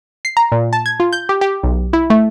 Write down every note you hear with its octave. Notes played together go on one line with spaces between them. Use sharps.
C7
A#5
A#2
A5
G#6
F4
G6
G4
G4
B1
E4
A3